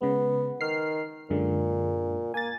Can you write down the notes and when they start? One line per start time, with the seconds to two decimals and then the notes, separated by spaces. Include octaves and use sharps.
0.02 C#3 G#3 B3
0.61 D#3 F6 C7
1.30 F#2 A#2 D3 G#3
2.34 A#3 G#5 A6